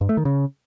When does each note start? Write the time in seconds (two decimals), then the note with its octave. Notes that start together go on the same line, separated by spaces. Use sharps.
0.01 G2
0.09 A3
0.17 D#3
0.25 C#3